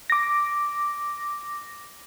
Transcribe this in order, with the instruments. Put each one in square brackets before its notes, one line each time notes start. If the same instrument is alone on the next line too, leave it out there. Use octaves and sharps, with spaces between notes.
[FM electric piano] D6 A#6